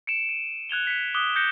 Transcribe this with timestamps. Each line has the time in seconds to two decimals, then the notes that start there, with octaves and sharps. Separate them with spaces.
0.07 C#7 D7 E7
0.29 D#7
0.69 F#6 G#6 F7 G7
0.87 B6 C#7
1.14 D6 D#6 F#6 B6 G7
1.35 F#6 G6 A#6 C#7